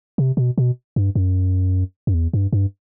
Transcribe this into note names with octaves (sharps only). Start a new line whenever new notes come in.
C3
B2
B2
G2
F#2
F#2
E2
G2
G2